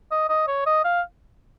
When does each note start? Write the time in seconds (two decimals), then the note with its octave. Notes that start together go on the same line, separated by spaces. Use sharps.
0.11 D#5
0.29 D#5
0.48 C#5
0.66 D#5
0.84 F5